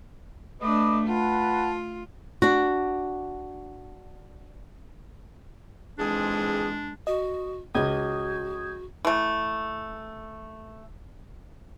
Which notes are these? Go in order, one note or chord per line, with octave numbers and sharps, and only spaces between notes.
A3 D4 B4 D#5 D6
F4 B4 F#5 A5
D4 F#4
F2 G#2 E3 G#3 D4 G#4
F#4 D#5
C#2 F#4 D#6 G6 G#6
E3 A3